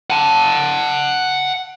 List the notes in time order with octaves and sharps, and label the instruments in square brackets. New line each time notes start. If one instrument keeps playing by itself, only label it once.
[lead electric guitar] F#5 A5